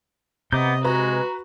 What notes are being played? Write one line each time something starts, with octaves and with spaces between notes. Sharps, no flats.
C3 B3 D#5 A#5 D6 G6
G#3 F#4 B4 A#5